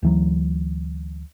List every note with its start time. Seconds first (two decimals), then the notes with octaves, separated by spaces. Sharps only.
0.03 D2 E3 F#3